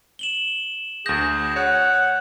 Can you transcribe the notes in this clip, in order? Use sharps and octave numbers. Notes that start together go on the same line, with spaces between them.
E7 F#7 G7
D2 G#4 G6 A#6
C#5 F#5